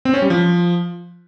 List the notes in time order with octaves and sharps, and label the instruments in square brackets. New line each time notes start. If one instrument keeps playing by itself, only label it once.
[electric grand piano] C4
C#4
G3
F3